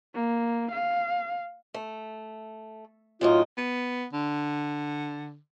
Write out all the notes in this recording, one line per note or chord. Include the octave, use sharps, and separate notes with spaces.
A#3
F5
A3
F#2 A2 D#4 F4
B3
D3